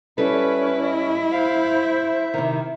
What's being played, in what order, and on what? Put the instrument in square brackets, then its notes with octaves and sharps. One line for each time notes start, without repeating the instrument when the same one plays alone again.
[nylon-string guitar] G3 A4 [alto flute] C#4 [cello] E4 [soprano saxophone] B4
[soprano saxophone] D#5
[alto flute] C5 [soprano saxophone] F5
[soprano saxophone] E5
[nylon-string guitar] C3 D#3